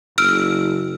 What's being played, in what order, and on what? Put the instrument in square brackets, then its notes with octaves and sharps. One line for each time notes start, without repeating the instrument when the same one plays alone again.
[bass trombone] F#1 [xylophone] E6 F6 D7